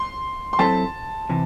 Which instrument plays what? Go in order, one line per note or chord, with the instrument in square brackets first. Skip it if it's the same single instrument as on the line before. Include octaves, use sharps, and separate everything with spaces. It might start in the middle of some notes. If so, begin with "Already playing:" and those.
Already playing: [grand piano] C6
C6
[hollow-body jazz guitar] F#3 C4 E4 A4 C5 [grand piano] A5
[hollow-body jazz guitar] C3 E3